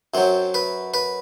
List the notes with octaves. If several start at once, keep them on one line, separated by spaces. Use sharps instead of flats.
F#2 F#3 C4
B4
B4